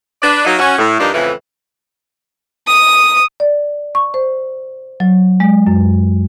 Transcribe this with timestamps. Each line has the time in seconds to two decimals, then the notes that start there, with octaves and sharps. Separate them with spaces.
0.23 D4 B4 D5
0.45 F#3 A#3 D#4
0.59 C#4 F#4
0.78 A2
1.00 G2 F3 D4 D#4 A#4 D5
1.13 F2 A2 C#3 E3
2.67 D#6
3.40 D5
3.95 C#6
4.14 C5
5.00 F#3
5.40 G#3
5.67 F#2